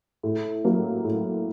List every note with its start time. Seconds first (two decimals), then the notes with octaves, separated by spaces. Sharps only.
0.23 A2
0.64 F#3 A#3
1.04 A2